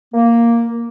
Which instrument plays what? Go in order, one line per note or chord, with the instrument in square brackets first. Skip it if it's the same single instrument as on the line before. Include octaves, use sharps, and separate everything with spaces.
[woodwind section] A#3